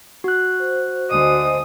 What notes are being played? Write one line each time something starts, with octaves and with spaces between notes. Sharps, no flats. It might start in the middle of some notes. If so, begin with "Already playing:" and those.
F#4 F#6
C5
D2 C5 D#5 G#5 D#6